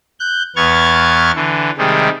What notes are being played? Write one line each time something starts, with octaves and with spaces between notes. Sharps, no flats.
F#6 G6
E2 B3 C#6 F6 G#6 A6
D3 E3
C3 D#3 G3 G#3